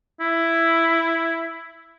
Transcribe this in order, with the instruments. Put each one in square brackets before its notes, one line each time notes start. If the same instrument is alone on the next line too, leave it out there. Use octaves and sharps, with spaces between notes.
[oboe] E4